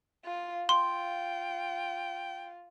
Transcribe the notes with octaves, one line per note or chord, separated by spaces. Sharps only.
F4
F4 G5 C6